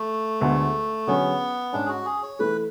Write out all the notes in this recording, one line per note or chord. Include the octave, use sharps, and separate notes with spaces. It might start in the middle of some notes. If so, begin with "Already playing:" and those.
Already playing: A3
D2 D3 G#3 B3
D3 F#3 B3 C#4 G#4
G#2 G#3 C#4 D4
G#4
F#4
G#4
C#5
E3 A3 E4 A4 B4